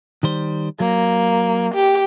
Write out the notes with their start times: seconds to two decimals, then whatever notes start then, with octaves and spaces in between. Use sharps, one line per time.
0.23 D#3 G3 C5
0.80 F#3 A#3
1.74 G4